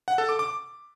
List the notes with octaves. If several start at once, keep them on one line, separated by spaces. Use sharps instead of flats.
F#5
A4
D6
D6